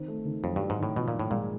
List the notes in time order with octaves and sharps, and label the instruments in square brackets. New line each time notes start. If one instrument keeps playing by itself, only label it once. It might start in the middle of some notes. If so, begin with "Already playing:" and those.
Already playing: [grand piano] D#3 C4
A3
D#3
[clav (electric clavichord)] F2 [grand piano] F#3
[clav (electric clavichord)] G2 [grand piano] F#3
[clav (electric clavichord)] G#2
[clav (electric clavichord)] A2 [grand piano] D#3
[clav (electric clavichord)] B2 [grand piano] F3
[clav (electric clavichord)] A#2
[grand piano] G#2
[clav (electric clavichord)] A2
[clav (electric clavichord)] A#2 [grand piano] G#3